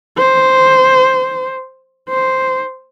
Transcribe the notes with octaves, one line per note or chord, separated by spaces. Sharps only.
C5
C5